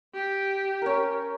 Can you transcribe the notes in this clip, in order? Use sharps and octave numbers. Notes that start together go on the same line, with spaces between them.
G4
C#4 A#4